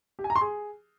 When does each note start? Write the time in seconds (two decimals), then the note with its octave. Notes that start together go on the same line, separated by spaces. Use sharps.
0.19 G4
0.24 G#5
0.30 A#5
0.36 C6
0.41 G#4